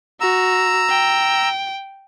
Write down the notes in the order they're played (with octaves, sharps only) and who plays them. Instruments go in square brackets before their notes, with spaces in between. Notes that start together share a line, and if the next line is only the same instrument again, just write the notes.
[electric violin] F#4 [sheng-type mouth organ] A#5 E6
[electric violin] G5